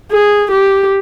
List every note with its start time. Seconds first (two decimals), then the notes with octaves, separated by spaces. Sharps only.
0.12 G#4
0.51 G4